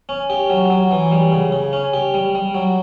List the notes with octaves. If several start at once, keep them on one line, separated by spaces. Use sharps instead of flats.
C#4
G4
F#3
F#3
E3
G3
C#3
C#3
C#4
G4
G3
G3
F#3